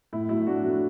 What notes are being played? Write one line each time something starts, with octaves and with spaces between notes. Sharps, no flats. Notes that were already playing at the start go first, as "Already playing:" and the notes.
A2 E4
F#3 A3 E4
A2 D4 F#4
F#3 A3